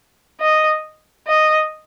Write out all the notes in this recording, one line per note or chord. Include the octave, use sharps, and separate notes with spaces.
D#5
D#5